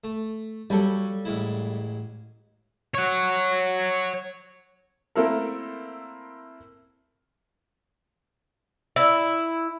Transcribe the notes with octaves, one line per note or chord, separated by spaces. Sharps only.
A3
F#3 G3 A#3 A4 C#5
A1 G#3 E4
C#5 F#5
A3 A#3 C4 E4 A4 A#4
E4